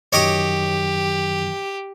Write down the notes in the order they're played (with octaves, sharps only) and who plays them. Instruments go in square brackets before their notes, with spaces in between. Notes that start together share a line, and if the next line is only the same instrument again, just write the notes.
[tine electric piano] F#2 D#3 F#3 [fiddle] G4 [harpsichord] C#5 D#5 D6